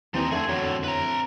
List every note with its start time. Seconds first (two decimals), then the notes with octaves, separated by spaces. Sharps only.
0.14 D#2 E3 F3 C4 D#4
0.31 F2 D3 A3 G#4 A4 G#6
0.49 E2 A2 F#3
0.84 A2 B4 A#5